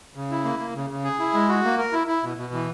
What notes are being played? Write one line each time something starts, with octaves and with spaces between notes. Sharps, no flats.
C#3
E4
A#3
A#3
C#3
C#3
G#4
E4
G#3
F#4
A#3
A#4
E4
E4
B2
B2
E3